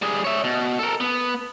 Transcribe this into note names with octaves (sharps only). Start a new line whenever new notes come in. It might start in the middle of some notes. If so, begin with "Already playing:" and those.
G3 G#4
C#5 E5
B2
A4 A#4
B3